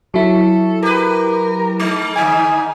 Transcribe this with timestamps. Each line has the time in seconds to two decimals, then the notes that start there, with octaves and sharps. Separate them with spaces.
0.14 F#3 E4 A4
0.83 G4 A#4 B4
1.80 G#3 D#4
2.16 G#2 D3 D#4 G#5